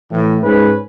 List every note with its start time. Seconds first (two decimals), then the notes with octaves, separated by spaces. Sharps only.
0.11 A2 E3
0.43 G#2 C#4 B4